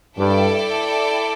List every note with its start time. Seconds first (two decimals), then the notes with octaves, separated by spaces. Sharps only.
0.18 G2 E4 A4 D5 G5